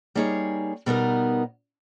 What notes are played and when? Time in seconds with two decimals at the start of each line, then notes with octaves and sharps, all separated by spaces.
0.15 G3 A#3 D#4 G#4 C#5
0.86 B2 G3 B3 D#4 A#4